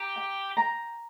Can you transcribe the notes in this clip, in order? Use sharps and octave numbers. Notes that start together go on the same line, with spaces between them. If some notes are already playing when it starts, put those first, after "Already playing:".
Already playing: G4 A#5
G5
A#5